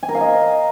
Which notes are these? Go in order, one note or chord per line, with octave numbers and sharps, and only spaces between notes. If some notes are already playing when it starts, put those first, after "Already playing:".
G#5
A#4
F5
D#5